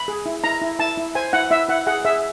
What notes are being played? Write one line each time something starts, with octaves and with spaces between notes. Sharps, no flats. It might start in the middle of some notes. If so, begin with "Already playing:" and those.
Already playing: B5
G#4
E4
E4 A#5
E4
E4 A5
E4
C5 G#5
E4 F#5
E4 E5
E4 F#5
G#4 F#5
G#4 E5